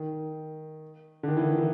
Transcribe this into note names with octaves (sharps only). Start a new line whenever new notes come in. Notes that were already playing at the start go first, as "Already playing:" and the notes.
Already playing: D#3
D3
D#3
E3
D#3
E3